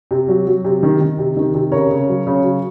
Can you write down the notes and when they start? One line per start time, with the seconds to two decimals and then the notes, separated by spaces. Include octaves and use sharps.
0.11 C3
0.28 F#3
0.47 F#3
0.65 C3
0.83 D#3
1.01 D#3
1.19 C3
1.37 D#3
1.55 C3
1.72 C#3 A#4 C#5
1.91 C#3
2.09 F#3
2.27 C#3
2.44 F#3